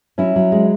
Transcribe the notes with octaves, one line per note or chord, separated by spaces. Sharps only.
F#3 C#4 E4
F#3
G#3